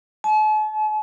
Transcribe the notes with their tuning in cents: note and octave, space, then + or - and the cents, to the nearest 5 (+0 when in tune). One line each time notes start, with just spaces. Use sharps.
A5 -45